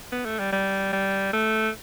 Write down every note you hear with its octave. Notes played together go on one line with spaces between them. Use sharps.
B3
A3
G3
G3
G3
A3